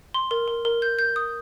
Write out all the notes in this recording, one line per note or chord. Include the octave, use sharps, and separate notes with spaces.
C6
A#4
A#4
A#4
G6
G6
D#6